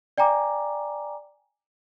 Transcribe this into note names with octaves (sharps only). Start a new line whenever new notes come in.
D5 G5 G#5 A#5 D6